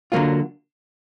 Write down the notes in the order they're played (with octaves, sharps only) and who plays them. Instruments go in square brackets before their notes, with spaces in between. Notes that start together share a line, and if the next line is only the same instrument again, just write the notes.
[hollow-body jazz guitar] D3 F#3 A#3 F4